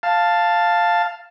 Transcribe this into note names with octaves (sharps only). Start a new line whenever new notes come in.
F5 A5